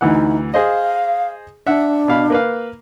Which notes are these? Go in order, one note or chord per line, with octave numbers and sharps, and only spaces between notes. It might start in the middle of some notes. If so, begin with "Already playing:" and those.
D2 E3 D#4 F#5
G#4 C5 D#5 F5
D4 E5 F#5
B2 F5 B5
A#3 B4 F5